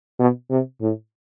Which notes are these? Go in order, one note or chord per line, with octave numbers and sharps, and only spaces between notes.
B2
C3
A2